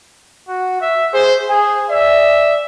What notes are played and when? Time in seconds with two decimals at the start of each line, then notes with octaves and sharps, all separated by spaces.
0.48 F#4
0.81 E5
1.13 G#4 C5
1.49 G#4 G#5
1.90 D5 E5